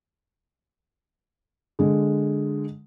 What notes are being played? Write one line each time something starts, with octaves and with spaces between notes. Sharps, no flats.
D3 G#3